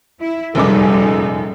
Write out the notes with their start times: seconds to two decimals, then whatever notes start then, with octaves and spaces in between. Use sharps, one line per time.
0.20 E4
0.55 F1 F#2 A#2 G3 G#3 D#4 A4 D6